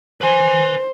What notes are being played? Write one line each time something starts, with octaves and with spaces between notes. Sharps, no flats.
B4 C5 G#5